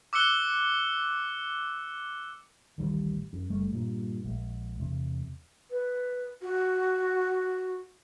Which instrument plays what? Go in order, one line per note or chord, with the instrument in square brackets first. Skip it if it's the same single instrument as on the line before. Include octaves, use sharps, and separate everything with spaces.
[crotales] D6 E6 F#6 C#7 G7
[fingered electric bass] D1 A1 D#3 G3
F#2
F#1 G3 A3
G2 A#2
A#1 G#3
E2 C3
[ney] B4
F#4